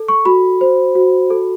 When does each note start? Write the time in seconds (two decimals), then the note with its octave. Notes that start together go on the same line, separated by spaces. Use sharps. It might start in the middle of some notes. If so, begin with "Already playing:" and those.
Already playing: A4
0.08 C#6
0.25 F#4 B5
0.61 C5
0.95 F#4
1.30 A4